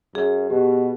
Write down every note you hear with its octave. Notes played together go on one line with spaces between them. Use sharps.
F#2 G#4
B2 G4